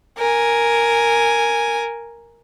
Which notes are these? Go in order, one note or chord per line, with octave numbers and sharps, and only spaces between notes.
A#4 G#5